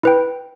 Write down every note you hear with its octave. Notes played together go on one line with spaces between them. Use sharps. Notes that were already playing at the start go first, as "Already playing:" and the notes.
E4 B4 G5